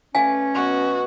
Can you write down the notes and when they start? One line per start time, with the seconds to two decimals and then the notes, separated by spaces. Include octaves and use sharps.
0.15 A3 C#4 B4 D5 F5 G#5
0.55 B2 F#3 B3 F#4